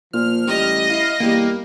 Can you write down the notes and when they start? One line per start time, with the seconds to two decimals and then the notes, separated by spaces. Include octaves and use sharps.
0.13 A#2 F3 F6
0.47 A1 G3 D#5
0.90 E4 F5
1.20 E2 G3 A#3